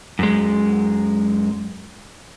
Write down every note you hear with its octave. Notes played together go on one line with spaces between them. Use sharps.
F#2 G#3